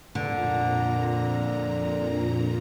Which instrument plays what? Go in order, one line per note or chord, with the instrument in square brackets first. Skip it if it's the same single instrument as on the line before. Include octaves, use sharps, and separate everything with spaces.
[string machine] F2 A#2 A#5 [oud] D3